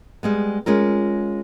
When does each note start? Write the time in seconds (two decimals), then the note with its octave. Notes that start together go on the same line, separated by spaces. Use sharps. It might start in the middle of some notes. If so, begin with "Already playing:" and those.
0.23 G3 G#3 B3
0.66 G#3 C#4 F4 A#4